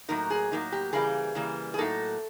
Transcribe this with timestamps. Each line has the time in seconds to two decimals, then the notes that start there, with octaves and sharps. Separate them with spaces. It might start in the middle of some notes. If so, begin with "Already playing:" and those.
0.08 A2 F#3 A#3 D#4 A#4
0.30 G#4
0.52 A2 F#3 A#3 D#4
0.72 G4
0.93 C#3 E3 G3 A#3 G#4
1.35 C#3 E3 G3 A#3
1.74 G#4
1.78 A2 F#3 A#3 D#4 A4